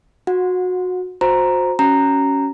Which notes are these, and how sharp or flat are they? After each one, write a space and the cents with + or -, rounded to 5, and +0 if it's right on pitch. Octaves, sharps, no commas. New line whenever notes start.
F#4 -20 F#5 -35
F#4 -30 C5 +0 A#5 +0
C#4 +0 F#4 +25 A#5 -10